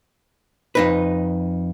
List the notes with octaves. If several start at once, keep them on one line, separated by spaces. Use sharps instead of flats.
F2 D#4 B4